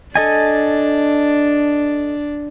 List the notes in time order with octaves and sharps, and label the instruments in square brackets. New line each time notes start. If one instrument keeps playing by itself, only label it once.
[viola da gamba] D4 [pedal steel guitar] A4 D#5 G#5